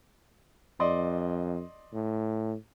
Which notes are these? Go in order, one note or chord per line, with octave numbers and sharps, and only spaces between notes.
F2 D5 D#5 C6
A2